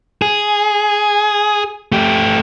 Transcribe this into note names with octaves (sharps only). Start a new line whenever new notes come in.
G#4
A3 G4